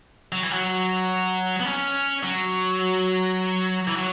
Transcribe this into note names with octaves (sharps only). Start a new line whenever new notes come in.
F#3
E3
F#3
B3
C#4
F#3
E3
F#3